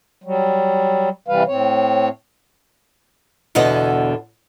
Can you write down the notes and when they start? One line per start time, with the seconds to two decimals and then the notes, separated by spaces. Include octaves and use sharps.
0.24 F#3 G3
1.28 C3 E3 G3 B4 F5
1.47 A2 C4 C#5
3.55 E2 B2 D3 B3 D#5